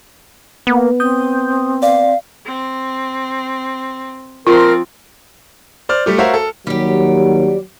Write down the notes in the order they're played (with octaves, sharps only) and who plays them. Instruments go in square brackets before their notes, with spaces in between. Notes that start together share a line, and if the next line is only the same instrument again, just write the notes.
[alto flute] A#3 [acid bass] B3
[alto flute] C4 [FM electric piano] D#6 G6
[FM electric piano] D5 [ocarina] F5
[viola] C4
[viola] F3 C4 [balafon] F4 [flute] A#4
[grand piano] C5 D5 F6
G3 A3 G4
F#4 A#4 C5 C#5 E5 F5
A4
[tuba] D#2 [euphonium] F#3 [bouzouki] G3 G4